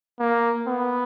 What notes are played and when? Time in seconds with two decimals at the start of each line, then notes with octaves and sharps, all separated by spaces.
0.20 A#3
0.67 B3